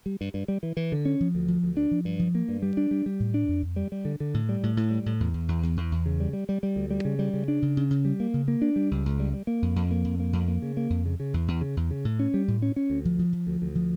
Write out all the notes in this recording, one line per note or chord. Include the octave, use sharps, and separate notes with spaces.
G3
G2
G2
G3
E3
E3
D3
C#4
F3
D2
F3
D2
D4
F3
G2
F3
A#3
G2
G3
D4
G3
G3
A2
D4
F2
F2
G3
G3
D3
D3
A2
G3
A2
A2
G3
A2
E2
E2
E2
E2
E2
E2
C#3
G3
G3
G3
G3
D2
G3
C#3
G3
C#3
D4
C#3
C#3
C#3
G3
A#3
C#3
A#3
D4
G3
C#2
C#2
G3
G3
A#3
F2
F2
A#3
F2
A#3
F2
A#3
C#3
A#3
F2
C#3
C#3
E2
E2
C#3
E2
C#3
A2
C#4
G3
A2
C#4
C#4
D2
F3
F3
F3
D2
D2
F3